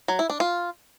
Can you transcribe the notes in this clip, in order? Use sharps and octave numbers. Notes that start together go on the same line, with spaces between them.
F#3
E4
D4
F4